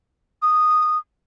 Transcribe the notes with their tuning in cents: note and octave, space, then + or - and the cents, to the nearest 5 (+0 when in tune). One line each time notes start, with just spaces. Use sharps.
D#6 -10